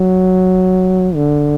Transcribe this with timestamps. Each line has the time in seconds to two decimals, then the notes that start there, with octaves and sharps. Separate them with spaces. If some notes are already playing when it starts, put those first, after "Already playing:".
Already playing: F#3
1.15 D3